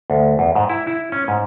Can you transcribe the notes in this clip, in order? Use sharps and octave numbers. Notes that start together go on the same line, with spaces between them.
D2
E2
G#2
E4
E4
C#4
G#2